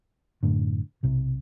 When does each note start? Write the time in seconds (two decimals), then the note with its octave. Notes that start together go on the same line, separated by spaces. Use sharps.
0.43 F#2 A2 D3
1.03 B1 C3